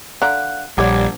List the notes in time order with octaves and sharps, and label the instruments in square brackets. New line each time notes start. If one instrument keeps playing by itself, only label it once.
[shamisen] D3 D5 A#5 [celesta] F5 F#5 F#6
[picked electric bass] A#1 [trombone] G3 [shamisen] G4 C#5 D5 [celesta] F#5 D6 G#6